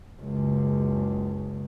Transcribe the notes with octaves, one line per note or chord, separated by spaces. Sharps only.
F#1 C#2